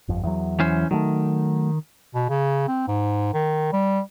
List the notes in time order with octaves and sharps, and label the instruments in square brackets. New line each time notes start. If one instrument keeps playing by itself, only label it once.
[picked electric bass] G1 F2
E2 F#3
[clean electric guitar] E3 C#4 C5
[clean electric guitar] D#3 [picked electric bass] F#3 A3
[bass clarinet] B2
C#3
C4
G#2
D#3
G3